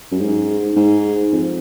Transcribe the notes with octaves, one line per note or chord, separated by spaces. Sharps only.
F#2
G#2
G#2
F2